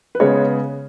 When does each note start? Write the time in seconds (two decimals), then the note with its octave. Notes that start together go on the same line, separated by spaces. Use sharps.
0.15 B4
0.20 C#3 G#3 B3 C#5